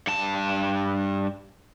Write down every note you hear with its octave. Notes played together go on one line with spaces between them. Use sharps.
G2 A5